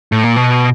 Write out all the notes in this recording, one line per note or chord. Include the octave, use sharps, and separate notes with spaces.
A2
A#2
B2